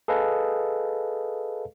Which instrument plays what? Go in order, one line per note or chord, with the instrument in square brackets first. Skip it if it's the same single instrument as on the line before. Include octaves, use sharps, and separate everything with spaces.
[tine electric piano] G#4 A4 B4 D#5 F5